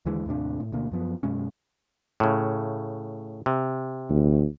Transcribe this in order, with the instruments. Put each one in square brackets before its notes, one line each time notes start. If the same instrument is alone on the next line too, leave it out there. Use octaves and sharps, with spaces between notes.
[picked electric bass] D#2 D3 E3 G#3
D#2 A2 C3 D4
A2
D2 B2 D3 A#3
F#2 F3 B3
F#2 B2 G#3 C#4
[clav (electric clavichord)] A2 C#3
C3
[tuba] D2